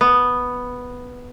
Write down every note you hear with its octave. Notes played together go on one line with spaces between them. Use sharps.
B3